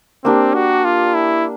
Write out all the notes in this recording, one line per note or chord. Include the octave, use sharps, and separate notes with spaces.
A#3 C4 D4 G4
F#4
F4
E4